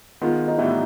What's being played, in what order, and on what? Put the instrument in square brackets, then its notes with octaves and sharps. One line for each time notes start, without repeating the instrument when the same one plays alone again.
[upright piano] D#3 G#3 B3 [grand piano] F4
[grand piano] D#4
[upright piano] A2 E3 G3 B3 D#4 [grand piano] E4